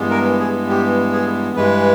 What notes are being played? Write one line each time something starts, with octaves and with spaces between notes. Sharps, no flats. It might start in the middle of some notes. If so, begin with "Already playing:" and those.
Already playing: G2 E3 G#3 B3
A#4
G#4
G4
G#4
G2 E3 G#3 B4